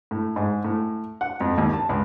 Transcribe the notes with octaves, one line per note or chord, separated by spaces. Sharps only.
A2
G#2
A2
F#5
F2
D#2
A5
C#2